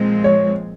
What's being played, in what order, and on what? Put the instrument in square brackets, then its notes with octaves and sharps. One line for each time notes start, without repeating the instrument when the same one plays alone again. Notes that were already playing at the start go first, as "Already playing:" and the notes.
Already playing: [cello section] A#2 F3 G#3 C4
[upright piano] C#5